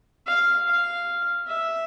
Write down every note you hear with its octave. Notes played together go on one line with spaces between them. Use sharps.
F5
F5
E5